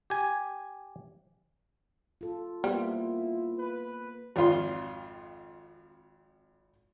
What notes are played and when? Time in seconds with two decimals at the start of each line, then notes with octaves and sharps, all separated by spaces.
0.10 G4 G#5
2.21 F4 A4
2.64 G3 A#3 B3 E4 F4 C5
3.59 B4
4.36 G#1 F2 F4 C6